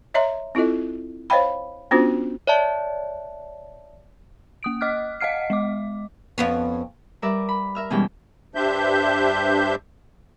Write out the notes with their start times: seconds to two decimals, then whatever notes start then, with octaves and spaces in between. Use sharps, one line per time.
0.14 C#5 D#5 E5 A#5 C6
0.55 C4 E4 F4 A4 D#5
1.30 C5 C#5 D#5 F5 G5 B5
1.91 B3 C#4 D4 F4 F#4 C5
2.47 C#5 D5 E5 A5
4.63 A#3 D#6 D7
4.81 D#5 D6 F6 F#6
5.20 D#5 F5 F#5 F6 C7
5.50 G#3 D#5 D6
6.38 F2 B3 C#4
7.22 G3 A#4 B4 D5 E5
7.49 B5
7.75 A#4 E5 F6
7.90 B2 E3 G3 G#3 C#4 G5
8.55 G2 D4 G4 C5 E5 G6